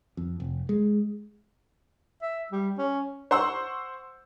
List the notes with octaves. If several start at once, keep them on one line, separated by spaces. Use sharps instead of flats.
F2
F1
G#3
E5
G3
C#4
C5 F#5 C6 C#6 E6